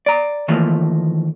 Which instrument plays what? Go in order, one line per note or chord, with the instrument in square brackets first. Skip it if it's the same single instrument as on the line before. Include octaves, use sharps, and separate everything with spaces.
[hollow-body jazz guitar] D5 A#5
D#2 E3 F3 A3 A#3